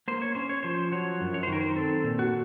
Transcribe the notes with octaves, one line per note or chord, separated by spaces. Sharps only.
A#3 C5
C#5
C#4 C5
C#5
F3 C5
F#3 C#5
F#2
C#5
C5
D#3
A#4
C5
C4 A4
A#2
F#4